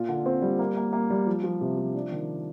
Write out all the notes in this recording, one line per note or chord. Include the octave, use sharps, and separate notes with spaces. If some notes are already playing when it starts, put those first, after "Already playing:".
Already playing: A#2 F4
D3
C4
G3
A#3
A#3
A#3
G3
F3
F3
C3
F3
D4
D#3